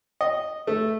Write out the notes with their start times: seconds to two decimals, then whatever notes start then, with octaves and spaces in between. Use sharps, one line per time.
0.21 D#5
0.67 A3